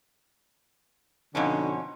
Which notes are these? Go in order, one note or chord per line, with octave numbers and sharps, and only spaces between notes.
F2 B2 D3 C#4 D#4 F#4